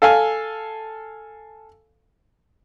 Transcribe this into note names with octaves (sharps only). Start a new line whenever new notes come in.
A4 F5 G#5